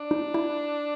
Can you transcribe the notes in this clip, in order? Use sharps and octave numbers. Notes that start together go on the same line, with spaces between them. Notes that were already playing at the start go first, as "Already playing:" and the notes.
Already playing: D4
D#4
E4